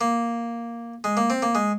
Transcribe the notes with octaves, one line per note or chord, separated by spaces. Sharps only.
A#3
G#3
A#3
C4
A#3
G#3